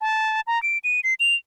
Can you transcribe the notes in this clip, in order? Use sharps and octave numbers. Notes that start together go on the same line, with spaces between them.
A5
A#5
D7
D#7
C7
F7